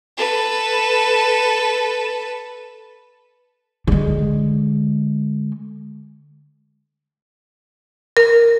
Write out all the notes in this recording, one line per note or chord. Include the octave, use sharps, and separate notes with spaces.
A4 B4
D3 G#3
A#4